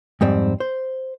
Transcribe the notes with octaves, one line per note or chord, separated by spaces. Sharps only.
F2 G#2 G3 C4
C5